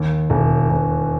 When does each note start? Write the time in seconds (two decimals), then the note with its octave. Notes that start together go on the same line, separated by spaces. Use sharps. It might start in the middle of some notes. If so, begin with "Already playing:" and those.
Already playing: D#2
0.30 E1
0.70 E1